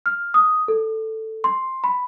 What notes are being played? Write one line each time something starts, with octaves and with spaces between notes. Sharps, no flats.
F6
D#6
A4
C6
B5